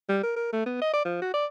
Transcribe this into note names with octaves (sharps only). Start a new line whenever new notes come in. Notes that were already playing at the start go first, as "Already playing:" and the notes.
G3
A#4
A#4
A3
B3
D#5
D5
F3
F#4
D5